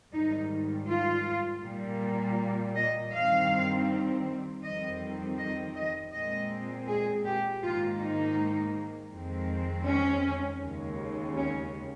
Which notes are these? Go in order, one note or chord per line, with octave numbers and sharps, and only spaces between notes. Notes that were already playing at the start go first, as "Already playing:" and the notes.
G#2 D#3 G3 D#4
F4
A#2 G3 A#3
D#5
G2 D#3 G3 C4 F5
F2 D#3 G3 C4 D#5
D#5
D#5
A#2 G#3 C4 D#5
G#4
G4
G#2 D#3 A#3 F4
D#4
F2 D#3 G#3 C4
C#4
D#2 C#3 G#3
C#4